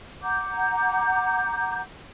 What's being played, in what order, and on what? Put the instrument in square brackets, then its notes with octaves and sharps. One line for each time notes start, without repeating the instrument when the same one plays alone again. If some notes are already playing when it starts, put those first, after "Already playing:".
[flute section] F#5 A#5 D6 G6